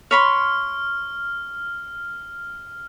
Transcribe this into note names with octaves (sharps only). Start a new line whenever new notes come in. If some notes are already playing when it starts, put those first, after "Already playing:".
C#5 B5 C6 F6